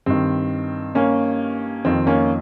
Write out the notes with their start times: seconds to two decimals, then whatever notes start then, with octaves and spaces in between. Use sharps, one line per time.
0.06 G2 D#3 C4
0.95 A#3 C#4
1.85 F2 D#3 C4
2.07 A#3 C#4